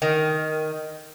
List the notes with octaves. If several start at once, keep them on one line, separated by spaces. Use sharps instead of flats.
D#3